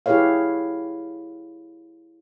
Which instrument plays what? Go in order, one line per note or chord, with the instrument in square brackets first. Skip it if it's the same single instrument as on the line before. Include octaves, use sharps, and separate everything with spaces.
[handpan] E4 G4 G#4 B4 C#5 F5